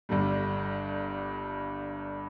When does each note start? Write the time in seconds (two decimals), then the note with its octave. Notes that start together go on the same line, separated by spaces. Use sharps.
0.09 G1 G2 D3 G3